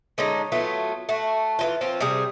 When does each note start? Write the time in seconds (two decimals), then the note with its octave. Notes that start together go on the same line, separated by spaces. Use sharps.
0.18 D3 G#3 C#4 D#4
0.52 F#3 A3 B3 F4
1.09 A3 F#4
1.59 E3 F#3 F4
1.81 F3 C4 C#4 F4
2.00 C3 G3 G#4